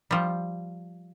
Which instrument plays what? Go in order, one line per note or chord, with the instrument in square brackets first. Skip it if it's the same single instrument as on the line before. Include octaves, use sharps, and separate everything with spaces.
[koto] F3 G3